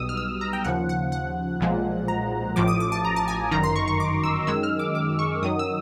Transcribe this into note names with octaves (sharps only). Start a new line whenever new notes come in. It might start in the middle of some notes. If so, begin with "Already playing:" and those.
Already playing: B1 B2 G3 D#6 E6
F6
E6
A#5
G5
D#2 C#3 F3 F#5
F#5
F#5
B1 A#2 F3 G#3
A#5
A1 A2 F3 D6
D#6
D6
A5
A#5
A5
G#5
G1 F#2 D#3 A#5
C6
C#6
C#6
D6
E6
F#2 D#3 G#3 E6
F6
D6
D6
C#6
F#2 D#3 F#3 D#6
E6